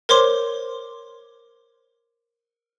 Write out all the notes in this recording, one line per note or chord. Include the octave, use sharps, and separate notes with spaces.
A#4 C5 C#5 C6 D6